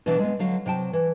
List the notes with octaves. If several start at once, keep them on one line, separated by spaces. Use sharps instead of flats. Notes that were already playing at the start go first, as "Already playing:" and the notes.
B2 E3 D4
G#3 B3
D3 F#3 F5
C3 F#3 G5 A5
E3